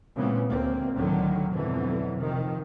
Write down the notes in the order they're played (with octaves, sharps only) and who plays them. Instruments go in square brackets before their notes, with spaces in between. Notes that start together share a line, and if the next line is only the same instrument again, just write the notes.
[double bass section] A#2 C#3 E3 G#3 B3 C4
D2 A#3 C4
C#2 A2 D3 D#3 F#3
F2 G#2 B2 D3 E3 F#3
C3 D#3 F3